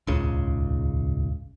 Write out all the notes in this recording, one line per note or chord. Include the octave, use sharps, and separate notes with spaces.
D#1 G#1 C#2 C#3